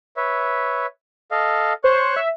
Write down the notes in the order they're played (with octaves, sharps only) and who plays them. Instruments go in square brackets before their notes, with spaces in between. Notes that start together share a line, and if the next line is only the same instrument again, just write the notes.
[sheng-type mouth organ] B4 C#5 E5
A4 D#5 F5
[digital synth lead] C5 [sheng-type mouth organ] C#5 C#6 F#6
[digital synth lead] E5